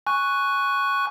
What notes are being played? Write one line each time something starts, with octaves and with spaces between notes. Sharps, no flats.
G#5 C#6 F#6